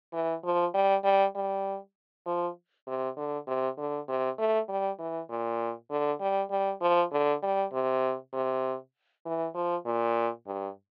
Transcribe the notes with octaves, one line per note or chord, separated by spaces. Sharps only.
E3
F3
G3
G3
G3
F3
C3
D3
C3
D3
C3
A3
G3
E3
A#2
D3
G3
G3
F3
D3
G3
C3
C3
E3
F3
A#2
G2